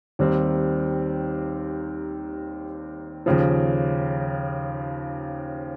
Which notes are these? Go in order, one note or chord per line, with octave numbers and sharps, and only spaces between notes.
D#2 D#3 G3 C4
D#2 C#3 F3